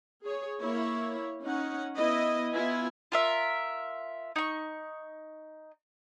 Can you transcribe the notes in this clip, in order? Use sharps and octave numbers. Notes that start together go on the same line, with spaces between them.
G#4 C#5
A#3 E4 C#5
C#4 D#4 F#5
B3 E4 D#5
B3 E4 F4 G#5
F4 A#4 E5
D#4 C#6